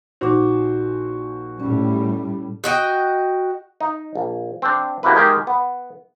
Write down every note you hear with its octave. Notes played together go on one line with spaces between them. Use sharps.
A#1 D#4 F#4 C5 D6
A2 G3 C#4
F#4 D#5 G5
D#4
A#1
C4 D4
F#2 C3 A#3 E4 B4
D#3 G#3 G4 A#4
B3